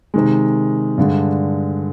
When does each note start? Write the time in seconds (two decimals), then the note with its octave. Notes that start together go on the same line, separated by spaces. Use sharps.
0.14 C3 D#3 G#3
0.98 G2 D3 G#3